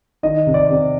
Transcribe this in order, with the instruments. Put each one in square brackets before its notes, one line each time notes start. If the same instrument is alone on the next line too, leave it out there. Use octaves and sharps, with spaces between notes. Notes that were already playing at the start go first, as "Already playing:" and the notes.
[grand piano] D#3 D#5
C3
D5
C3